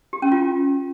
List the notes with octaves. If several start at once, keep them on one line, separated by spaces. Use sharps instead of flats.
G4
C#4
F4